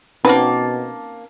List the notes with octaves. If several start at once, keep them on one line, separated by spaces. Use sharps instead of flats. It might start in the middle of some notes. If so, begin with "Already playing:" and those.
B2 A#3 C4 C#4 D#4 F#4 B4 A5